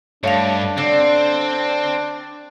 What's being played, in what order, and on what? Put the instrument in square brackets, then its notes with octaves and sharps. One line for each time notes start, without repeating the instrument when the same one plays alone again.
[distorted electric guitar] G2 [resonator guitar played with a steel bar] A3 [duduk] D4 [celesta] C#5 F5 F7
[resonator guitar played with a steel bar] D3 [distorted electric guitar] C4